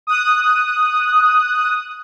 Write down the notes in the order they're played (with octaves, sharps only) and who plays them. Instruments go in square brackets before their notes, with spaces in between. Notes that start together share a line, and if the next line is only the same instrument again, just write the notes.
[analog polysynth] D#6 F#6